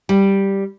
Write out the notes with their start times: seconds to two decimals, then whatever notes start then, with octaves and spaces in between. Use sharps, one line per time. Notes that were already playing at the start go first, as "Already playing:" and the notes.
0.09 G3